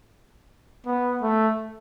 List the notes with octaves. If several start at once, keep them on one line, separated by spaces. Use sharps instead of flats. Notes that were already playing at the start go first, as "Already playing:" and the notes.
B3
A3